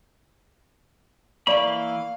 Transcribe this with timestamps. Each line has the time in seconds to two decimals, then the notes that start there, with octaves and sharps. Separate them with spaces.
1.47 E3 A#3 D5 F5 B5 C#6